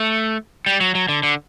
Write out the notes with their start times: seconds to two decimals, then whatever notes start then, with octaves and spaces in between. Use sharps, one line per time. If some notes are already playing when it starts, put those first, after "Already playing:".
Already playing: A3
0.66 G3
0.81 F#3
0.95 F#3
1.09 D3
1.23 D3